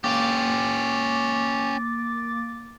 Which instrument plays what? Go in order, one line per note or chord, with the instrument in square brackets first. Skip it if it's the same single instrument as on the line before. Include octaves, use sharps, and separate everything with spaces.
[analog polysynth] A#3 D6 A6 [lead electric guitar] C#4 G4